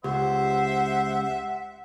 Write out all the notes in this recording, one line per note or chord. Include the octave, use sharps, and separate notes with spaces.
C#2 G4 C5 E5 F#5